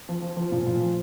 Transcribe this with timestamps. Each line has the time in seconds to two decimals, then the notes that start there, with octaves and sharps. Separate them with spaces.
0.09 F3
0.22 F3
0.37 F3
0.52 A#2 F3 F4
0.67 A#2
0.80 F3